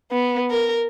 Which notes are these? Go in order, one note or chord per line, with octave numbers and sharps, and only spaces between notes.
B3
A#4